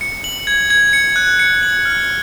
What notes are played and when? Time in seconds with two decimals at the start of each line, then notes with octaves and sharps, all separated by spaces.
0.01 C#7
0.24 F#7
0.47 G#6
0.70 G#6
0.93 C#7
1.16 F#6
1.39 C#7
1.63 F#7
1.85 F6